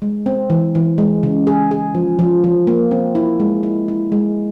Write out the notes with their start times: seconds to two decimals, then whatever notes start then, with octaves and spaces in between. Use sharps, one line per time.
0.02 G#3
0.26 C4
0.50 E3
0.75 E3
0.98 G#3
1.23 C#3
1.47 G#4
1.71 G#4
1.95 F3
2.19 F3
2.44 F3
2.67 A#3
2.91 C4
3.15 E4
3.40 G#3
3.63 E4
3.88 E4
4.12 G#3